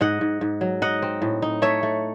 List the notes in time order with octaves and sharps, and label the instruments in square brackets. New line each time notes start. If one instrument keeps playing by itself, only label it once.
[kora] G#2 D#5 F#5
G#2
G#2
F#3
D#4 D#5 F#5
C4
A2
D#4
A3 C#5 E5
A3